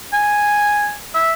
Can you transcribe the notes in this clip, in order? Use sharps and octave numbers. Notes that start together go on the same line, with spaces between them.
G#5
E5